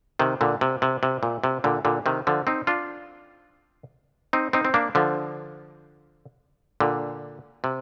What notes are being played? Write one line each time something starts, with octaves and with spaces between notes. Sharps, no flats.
C3 D#3
A#2 D3
C3
C3
C3
A#2
C3
A#2 D3
A#2 D3
C3 D#3
D3 F3
C4 D#4
D4 F4
C4 D#4
C4 D#4
C4
A#3 D4
D3 F3
A#2 D3
C3